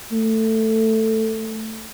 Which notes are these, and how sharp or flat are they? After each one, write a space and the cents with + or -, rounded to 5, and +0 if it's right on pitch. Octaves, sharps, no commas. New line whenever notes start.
A3 +10